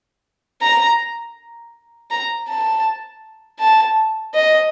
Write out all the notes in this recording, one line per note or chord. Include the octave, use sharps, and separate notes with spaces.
A#5
A#5
A5
A5
D#5